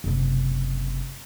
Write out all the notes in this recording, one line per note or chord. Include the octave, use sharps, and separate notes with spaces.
F#1 C3